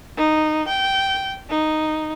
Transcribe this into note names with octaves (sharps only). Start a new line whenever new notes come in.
D#4
G5
D#4